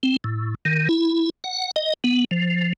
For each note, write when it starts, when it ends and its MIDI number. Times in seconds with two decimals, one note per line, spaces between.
0.03 0.16 60
0.24 0.55 45
0.65 0.88 51
0.89 1.30 64
1.44 1.71 78
1.76 1.94 75
2.04 2.24 59
2.31 2.73 53